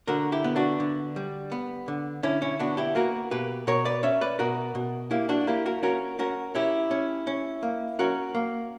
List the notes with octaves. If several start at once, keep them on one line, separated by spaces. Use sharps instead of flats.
D3 F#4 A#4
E4 G4
B3
D4 F#4
D3
G3
B3
D3
D3 C#4 E4
C#4 E4
B3 D4 F#4
E4 G4
A#3 F#4 A#4
B2 G4 B4
B2 A#4 C#5
B4 D5
C#4 C#5 E5
B4 D5
B2 F#4 A#4
B2
A#3 E4 G4
D4 F#4
A#3 E4 G4
F#4 A#4
C#4 F#4 A#4
C#4 F#4 A#4
C#4 E4 G4
C#4
C#4
A#3
C#4 F#4 A#4
A#3